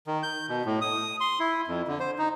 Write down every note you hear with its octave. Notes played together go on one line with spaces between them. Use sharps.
D#3
G6
B2
A2
D#6
C6
E4
F2
D3
C5
D#4